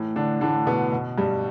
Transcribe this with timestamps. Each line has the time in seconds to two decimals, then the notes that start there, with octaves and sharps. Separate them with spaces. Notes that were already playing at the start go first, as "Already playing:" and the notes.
Already playing: A2 E3
0.16 D3 D4
0.41 A2 D3 E3 D4
0.66 B2 B3
0.92 B2
1.18 G2 G3